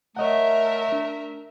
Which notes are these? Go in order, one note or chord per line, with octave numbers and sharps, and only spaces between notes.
A3 A#4 C#5 D#5 E5 F#5
D4